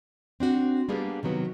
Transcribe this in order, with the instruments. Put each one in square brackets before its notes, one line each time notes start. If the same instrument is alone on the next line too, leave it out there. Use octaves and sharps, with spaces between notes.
[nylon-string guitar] C4 D4 F#4
G3 A#3 B3 D4 G4 G#4
C3 D#3 F#3 B3